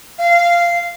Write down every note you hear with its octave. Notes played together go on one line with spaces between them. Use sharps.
F5